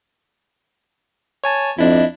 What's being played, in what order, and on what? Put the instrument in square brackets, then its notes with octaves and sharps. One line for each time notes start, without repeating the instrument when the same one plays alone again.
[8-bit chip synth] C#5 G#5 A5
[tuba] F2 [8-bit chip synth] D4 E4 [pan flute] D#5